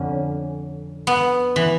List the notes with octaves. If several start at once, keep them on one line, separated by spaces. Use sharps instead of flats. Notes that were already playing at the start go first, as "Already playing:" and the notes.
Already playing: F2 D3 C#4
B3
E3